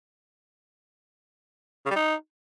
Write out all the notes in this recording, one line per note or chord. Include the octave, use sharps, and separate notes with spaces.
C#3
G3
D#4